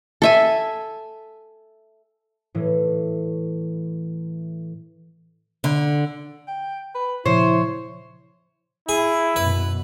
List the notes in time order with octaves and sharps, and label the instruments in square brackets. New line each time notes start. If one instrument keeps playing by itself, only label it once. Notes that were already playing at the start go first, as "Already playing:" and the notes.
[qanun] A4 E5 G#5
[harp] A2 E3
[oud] D3
[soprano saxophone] G5
B4
[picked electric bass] A#2 C#3 F3 [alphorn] E4 [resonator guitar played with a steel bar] C5 [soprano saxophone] C#5
[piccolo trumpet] E4 [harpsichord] G#4
[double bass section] F#2 B2 [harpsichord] B4